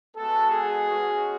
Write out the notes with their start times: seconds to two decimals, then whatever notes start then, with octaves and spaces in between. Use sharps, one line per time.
0.16 G#3 B3 F#4 A4
0.51 G#4
0.88 G#3 C#4 F#4